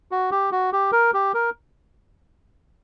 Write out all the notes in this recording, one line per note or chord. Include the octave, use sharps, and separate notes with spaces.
F#4
G4
F#4
G4
A#4
G4
A#4